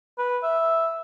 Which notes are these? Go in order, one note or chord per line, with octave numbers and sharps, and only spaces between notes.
B4
E5